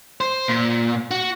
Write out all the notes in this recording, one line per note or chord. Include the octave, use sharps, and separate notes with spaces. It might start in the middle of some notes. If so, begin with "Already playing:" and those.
C5
A#2
F#4